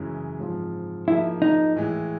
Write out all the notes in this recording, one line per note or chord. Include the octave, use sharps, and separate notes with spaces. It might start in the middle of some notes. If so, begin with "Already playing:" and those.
Already playing: F#2 C#3 E3 G#3
G#2 F3 G#3 C4 F4
F3 A#3 D#4 E4 G#4
D#4
A2 E3 G#3